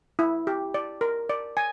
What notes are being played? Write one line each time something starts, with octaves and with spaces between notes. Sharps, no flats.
E4
G4
D5
A#4
D5
G#5